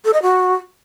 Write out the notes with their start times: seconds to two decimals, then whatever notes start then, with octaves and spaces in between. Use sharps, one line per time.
0.05 A4
0.14 D#5
0.22 F#4